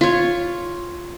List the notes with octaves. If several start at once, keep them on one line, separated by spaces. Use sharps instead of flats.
F4 C#5